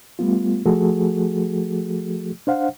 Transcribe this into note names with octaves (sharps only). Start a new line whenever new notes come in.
G3 A3 B3 F4
F3 A3 F#4 G#4 A4
D4 C5 F5 F#5